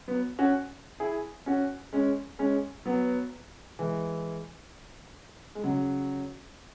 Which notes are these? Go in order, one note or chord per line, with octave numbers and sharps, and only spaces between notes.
F#3 B3
C#4 F#4
E4 G#4
C#4 F#4
G#3 C#4
G#3 C#4
F#3 B3
E3 G#3
G#3
C#3 F#3